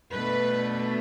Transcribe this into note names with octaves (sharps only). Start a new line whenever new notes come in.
B2 A3 D4 B4